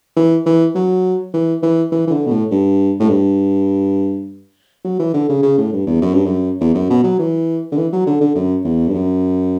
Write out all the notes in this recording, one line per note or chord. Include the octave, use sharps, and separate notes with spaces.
E3
E3
F#3
E3
E3
E3
E3
D3
B2
A2
G2
A2
G2
F#3
E3
D3
C#3
C#3
A2
G2
E2
F#2
G2
F#2
E2
F#2
B2
F#3
E3
D3
E3
F#3
D3
D3
F#2
E2
G2
F#2